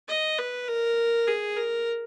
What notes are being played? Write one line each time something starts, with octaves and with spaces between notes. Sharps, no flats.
D#5
B4
A#4
G#4
A#4